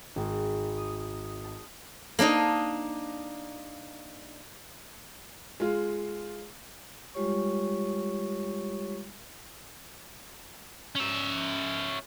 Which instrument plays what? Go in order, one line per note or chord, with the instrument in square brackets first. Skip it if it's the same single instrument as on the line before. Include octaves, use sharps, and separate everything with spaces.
[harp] G#1
D#6
A5
[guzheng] A#3 D4 D#4 D#5
[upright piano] G#3 F4
[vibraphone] G3 G#3 F4 G4 C#5 C#6
[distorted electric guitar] C#4 E5